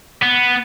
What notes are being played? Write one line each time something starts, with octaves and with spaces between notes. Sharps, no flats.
B3